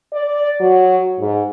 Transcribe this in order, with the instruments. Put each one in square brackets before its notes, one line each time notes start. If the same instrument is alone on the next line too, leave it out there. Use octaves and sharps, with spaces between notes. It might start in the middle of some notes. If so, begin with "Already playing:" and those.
[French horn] D5
F#3
G#2